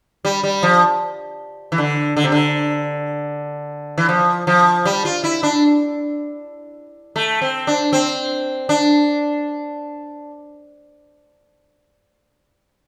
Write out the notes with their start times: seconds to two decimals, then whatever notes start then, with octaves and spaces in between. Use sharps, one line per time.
0.25 G3
0.44 G3
0.63 F3
1.72 E3
1.78 D3
2.17 D3
2.24 C3
2.32 D3
3.98 E3
4.09 F3
4.47 F3
4.85 G3
5.05 F4
5.24 E4
5.43 D4
7.16 A3
7.42 C4
7.67 D4
7.93 C4
8.69 D4